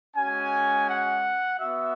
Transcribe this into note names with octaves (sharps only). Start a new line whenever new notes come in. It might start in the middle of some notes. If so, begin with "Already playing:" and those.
G#3 C#4 F#4 G#5
F#5
B3 F#4 E5